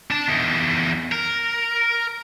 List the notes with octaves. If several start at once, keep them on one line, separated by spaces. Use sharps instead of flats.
D4 A5
E2 D#3
A#4